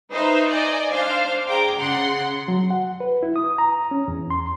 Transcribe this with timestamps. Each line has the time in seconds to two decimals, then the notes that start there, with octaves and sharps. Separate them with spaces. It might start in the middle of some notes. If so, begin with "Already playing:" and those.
0.10 D#4 B4 C5 E5
0.49 D5 D#5 G#5
0.92 D4 C5 F5
1.48 G#4 G5 A#5 D6
1.78 C#3 F#5 C6
2.48 F#3
2.70 F#5
3.00 B4
3.23 E4
3.36 D#6
3.58 A#5
3.91 C#4
4.08 E2
4.30 C6